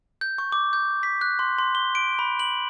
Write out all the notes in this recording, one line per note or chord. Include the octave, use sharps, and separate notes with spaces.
G6
C#6
D6
G6
B6
F#6
C6
C6
G7
D7
B5
F#7